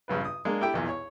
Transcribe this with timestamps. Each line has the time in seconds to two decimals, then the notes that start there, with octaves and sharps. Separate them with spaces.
0.08 A#1 G2 C#3 B4
0.25 D#6
0.45 G#3 A#3 D4
0.61 E4 G4 A4 G5
0.74 B1 E2 A#2
0.89 C#5